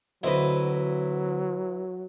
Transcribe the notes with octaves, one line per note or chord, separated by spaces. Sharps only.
D2 F#3 C4 E4 B4 D#5